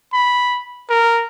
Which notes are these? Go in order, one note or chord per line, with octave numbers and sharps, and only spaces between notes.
B5
A#4